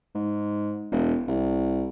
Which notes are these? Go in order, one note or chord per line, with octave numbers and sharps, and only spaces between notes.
G#2
E1
C2